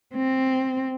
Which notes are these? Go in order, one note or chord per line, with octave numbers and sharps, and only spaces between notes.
C4